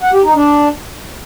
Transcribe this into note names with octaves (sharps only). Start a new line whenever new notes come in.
F#5
G4
D#4
D4